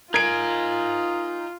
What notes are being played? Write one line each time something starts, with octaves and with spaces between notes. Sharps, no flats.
D#4 F4 A#4 G#5 G#6 D7